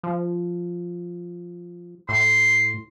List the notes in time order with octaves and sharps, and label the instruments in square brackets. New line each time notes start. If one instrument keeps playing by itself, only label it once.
[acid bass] F3
[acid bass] A2 [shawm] C6